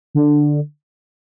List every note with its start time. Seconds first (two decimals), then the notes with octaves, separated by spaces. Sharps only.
0.15 D3